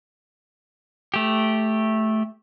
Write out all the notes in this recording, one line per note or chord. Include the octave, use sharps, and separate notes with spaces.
A3 G4